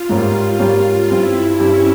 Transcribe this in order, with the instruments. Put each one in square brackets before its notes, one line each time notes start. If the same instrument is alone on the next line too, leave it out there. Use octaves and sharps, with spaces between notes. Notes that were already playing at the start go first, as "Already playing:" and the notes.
Already playing: [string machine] F4
[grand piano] G#2 G3 A#3 C#4 G4
G#2 G3 A#3 C#4 G4
[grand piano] G2 G3 C4 G4 [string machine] E4
[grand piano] G2 G3 C4 G4 [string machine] C#4